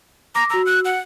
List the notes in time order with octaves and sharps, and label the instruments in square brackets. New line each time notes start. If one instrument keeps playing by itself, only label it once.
[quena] A#5 [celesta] D6 A#6
[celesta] F#4 E6 [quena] A#5
[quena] F#6
F#5